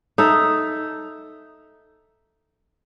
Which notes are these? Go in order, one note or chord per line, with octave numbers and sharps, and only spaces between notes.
D#4 A4 E5